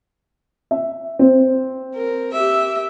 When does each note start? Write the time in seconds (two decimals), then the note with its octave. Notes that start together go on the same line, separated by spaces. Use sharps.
0.71 E5
1.19 C4
1.95 A#4
2.32 G4 E5